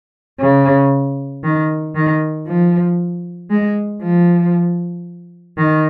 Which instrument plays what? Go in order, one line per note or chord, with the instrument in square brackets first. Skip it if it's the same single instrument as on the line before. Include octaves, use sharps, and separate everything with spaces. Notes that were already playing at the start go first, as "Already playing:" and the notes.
[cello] C#3
D#3
D#3
F3
G#3
F3
D#3